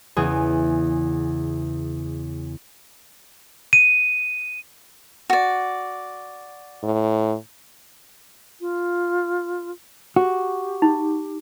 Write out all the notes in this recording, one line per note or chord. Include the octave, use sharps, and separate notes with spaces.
E2 C#3 G#4
D#7
F#4 D5
A2
F4
F#4 G4
D#4